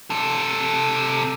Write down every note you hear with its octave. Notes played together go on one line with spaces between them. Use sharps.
C3 A4